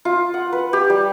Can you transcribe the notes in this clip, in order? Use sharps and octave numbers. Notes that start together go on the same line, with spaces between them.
F4
F#5
B4
G4
G3